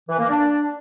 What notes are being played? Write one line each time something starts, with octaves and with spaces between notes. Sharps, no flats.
E3
A#3
D4